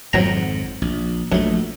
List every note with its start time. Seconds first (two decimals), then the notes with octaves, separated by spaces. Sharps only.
0.13 G#1 F2 G#2 F#3 C4 A#5
0.82 A#1
1.32 A#1 F#2 A3